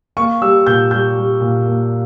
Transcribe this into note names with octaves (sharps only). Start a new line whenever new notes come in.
A#3 C#6
G3 E6
A#2 G6
G3 G6
G3
A#2
A#3